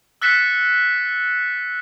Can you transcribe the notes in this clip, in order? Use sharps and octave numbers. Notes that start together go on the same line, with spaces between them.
E6 F#6 A6 B6 C#7 E7